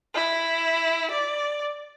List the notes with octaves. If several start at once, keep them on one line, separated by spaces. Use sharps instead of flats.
E4
D5